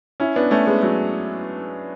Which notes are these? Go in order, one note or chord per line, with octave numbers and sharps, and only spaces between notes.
C#4 E4
B3 D4
A3 C#4
G#3 B3
F#3 A3